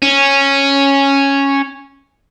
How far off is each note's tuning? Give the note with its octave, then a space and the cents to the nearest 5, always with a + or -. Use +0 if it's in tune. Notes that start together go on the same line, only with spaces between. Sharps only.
C#4 -5